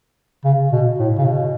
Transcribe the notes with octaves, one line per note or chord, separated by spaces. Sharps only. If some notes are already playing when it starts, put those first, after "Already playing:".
C#3
B2
A2
C#3
B2